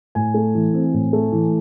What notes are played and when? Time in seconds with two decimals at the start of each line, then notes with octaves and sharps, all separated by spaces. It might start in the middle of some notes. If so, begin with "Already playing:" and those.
0.15 A2 G#5
0.34 A3
0.54 E3
0.74 C4
0.94 A2
1.13 A3
1.32 E3